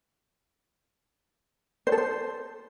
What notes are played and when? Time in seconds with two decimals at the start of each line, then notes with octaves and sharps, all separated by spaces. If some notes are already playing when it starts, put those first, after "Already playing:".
1.87 C5
1.92 A4
1.98 C5